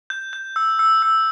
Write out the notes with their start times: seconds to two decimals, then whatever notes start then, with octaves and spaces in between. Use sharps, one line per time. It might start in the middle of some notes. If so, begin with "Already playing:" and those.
0.10 G6
0.33 G6
0.56 E6
0.79 E6
1.02 E6